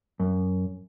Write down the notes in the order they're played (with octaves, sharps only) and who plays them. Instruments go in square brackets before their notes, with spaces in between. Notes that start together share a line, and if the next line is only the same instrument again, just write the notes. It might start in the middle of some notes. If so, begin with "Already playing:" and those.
[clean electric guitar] F#2